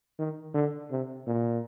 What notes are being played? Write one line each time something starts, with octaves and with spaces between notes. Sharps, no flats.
D#3
D3
C3
A#2